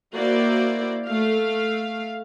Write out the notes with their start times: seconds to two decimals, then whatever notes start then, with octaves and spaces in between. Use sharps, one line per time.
0.15 A#3 E4 F#4 C5 D5
1.07 A3 F5